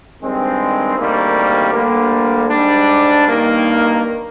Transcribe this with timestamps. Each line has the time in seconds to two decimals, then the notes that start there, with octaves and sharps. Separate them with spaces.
0.20 G2 D#3 G#3 C4
0.98 D2 C3 D#3 G3 A#3
1.73 D2 D3 G3 A#3
2.50 G#2 G3 D4
3.26 G2 D#3 A#3 D#4